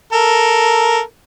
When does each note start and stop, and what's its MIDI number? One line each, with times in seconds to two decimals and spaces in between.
0.13 1.01 69
0.13 1.01 70